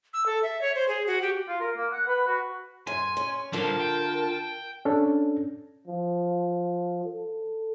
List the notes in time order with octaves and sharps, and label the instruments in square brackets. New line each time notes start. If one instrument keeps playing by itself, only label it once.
[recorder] E6
A4
E5
C#5
C5
G#4
F#4
G4
[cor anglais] F4
A#4
A#3
F#5
B4
F#4
[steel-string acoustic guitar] F#2 [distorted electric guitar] G#5 [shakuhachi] C6
[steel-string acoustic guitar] C#4
[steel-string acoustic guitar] D3 F4 [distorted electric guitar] G3 C5 [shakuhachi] A#4 [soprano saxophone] A5
[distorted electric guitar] G5
[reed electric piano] C#4 D4 A4
[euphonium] F3
A4